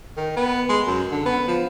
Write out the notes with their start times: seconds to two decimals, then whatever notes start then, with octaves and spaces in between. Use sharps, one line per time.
0.17 D#3
0.36 B3
0.69 G#3
0.87 F#2
1.12 D3
1.26 B3
1.48 F3